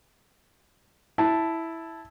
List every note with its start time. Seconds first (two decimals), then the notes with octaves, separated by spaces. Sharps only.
1.18 E4 A5